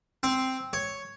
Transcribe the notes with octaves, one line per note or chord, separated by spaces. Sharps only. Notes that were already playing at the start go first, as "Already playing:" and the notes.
C4
C#5